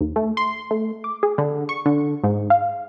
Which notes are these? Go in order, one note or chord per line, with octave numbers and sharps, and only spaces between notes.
D#2
A3
C6
A3
D6
G#4
D3
C#6
D3
G#2
F5